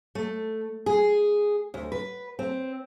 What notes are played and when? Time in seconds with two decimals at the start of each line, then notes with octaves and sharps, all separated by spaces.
0.15 A3
0.86 G#4
1.74 D2
1.92 B4
2.39 C4